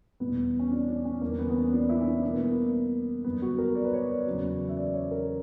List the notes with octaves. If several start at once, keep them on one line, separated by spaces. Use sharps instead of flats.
E2 B2 G3 B3
C#4
D4
D4
C#4
E2 D3 G3 A#3
B3
B3
C#4
D4
E4
C#4
D4
B2 G3 A#3
B3
A#3
F#2 D3 G3 B3
F#4
A#4
D5
B4
C#5
D5
E2 C#3 F#3
E5
D5
C#5
A#4